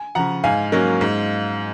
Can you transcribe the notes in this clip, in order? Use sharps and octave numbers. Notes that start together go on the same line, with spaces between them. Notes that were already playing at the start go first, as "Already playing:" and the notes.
Already playing: G#5
C#3 F3 F#5 A#5
G#2 F5 G#5
F#3 A#3 C#4
G#2